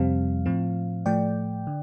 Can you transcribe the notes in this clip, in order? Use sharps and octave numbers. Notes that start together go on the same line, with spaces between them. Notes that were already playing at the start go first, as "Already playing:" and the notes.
Already playing: F2 C3 G3 C4 F5
A2 F3 C4
A2 F3 A3 D5 G5
D3